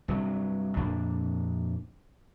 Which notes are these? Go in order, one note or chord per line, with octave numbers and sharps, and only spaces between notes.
G2 C3 F#3
F2 A#2 A#3 D4